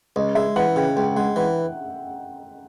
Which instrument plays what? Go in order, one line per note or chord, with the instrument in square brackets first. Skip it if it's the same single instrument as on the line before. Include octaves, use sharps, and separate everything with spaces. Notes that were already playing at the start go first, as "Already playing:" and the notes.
[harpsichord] C#2 [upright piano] D#5
[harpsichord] G#3 [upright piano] E5
[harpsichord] E3 [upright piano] F#5
[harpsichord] C#3 [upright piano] G5
[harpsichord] C#2 [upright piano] G5
[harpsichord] G#3 [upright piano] F#5
[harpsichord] E3 [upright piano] F#5